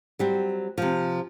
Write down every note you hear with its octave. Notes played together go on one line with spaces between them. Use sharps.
F#3 G3 C4
C3 F3